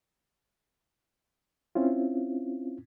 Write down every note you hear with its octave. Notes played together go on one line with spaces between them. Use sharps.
C4 C#4 E4 F4